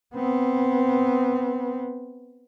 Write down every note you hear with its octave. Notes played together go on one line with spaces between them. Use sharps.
B3 C4